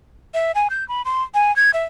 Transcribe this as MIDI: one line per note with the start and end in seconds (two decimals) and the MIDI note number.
0.34 0.52 76
0.55 0.68 80
0.70 0.87 91
0.88 1.02 83
1.05 1.23 84
1.34 1.54 80
1.56 1.71 92
1.74 1.84 76